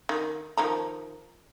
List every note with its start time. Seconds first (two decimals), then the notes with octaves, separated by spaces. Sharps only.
0.09 D#3
0.57 D#3 F3 A#5